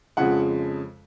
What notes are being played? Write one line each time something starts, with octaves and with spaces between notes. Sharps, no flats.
F2 C#3 F3 G#3 F#5